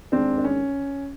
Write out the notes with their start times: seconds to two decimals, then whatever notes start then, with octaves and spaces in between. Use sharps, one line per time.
0.12 D#2 D#3 G#3 C4 D4
0.38 D4
0.44 C#4